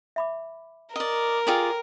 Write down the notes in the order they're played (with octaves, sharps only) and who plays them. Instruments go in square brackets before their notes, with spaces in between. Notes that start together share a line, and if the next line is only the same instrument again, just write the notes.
[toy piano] E5 B5 D6
[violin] A#4 [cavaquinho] D5 D#5
[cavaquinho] F4 G#4 D5 [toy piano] A4 G5 G#5